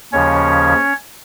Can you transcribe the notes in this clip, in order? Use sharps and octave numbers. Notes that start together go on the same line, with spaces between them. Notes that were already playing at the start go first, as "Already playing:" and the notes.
D#2 C#3 F3 C#4 C#5